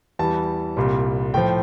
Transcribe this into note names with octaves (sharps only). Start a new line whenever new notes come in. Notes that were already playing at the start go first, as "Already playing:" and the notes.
E2 E3 G3 A5
C2 A#2 G3
A2 F3 G5